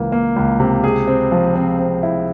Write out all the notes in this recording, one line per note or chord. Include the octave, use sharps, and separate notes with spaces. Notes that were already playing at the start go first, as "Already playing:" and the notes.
Already playing: C#2 E3 A#3
A#3
C#2
C3
G#4
C4
F3
C4
C4
E4